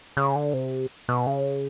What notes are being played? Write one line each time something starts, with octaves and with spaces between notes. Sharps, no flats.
C#3
D3
C3
B2
C#3